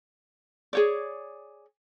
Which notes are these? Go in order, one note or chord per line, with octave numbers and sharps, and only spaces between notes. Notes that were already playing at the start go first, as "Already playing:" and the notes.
G#4 C#5 D5